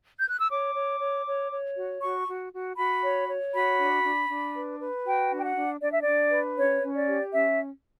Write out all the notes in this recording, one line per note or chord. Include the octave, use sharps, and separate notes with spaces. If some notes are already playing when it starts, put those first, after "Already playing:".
G6
F#6
E6
C#5 D6
C#5
C#5
C#5
C#5
F#4
F#4 C#6
F#4
F#4
F#4 B5
C#5
C#5
F#4 B5
D4
D4
D4
B4
B4
F#4 G5
D4
G5
F#5
D4
D4 D5
E5
D5
D4
B4
C#4 C#5
C#4
D5
G4
C#4 E5